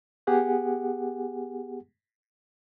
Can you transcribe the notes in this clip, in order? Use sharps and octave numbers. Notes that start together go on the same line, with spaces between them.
B3 G4 G#4 F#5 G#5